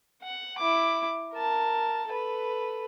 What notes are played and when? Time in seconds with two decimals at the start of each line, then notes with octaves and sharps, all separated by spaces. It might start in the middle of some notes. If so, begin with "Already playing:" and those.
0.23 F#5
0.58 E4 D6
1.34 A#4 A5
2.08 A4 B4